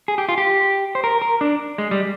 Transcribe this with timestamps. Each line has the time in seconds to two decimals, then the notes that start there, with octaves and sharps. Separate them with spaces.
0.08 G#4
0.18 G4
0.29 F4
0.38 G4
0.95 C5
1.04 A#4
1.22 A#4
1.41 D4
1.78 G#3
1.91 G3